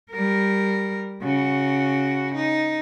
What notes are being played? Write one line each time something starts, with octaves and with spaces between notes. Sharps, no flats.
G3 A#4
C#3 F#4
D#4